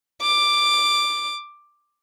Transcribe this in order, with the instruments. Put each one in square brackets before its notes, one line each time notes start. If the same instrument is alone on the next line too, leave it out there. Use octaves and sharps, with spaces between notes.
[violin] D6